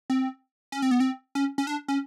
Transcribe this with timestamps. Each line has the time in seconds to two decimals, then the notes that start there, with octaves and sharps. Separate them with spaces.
0.10 C4
0.72 C#4
0.82 C4
0.91 B3
1.00 C4
1.35 C#4
1.58 C#4
1.67 D4
1.88 C#4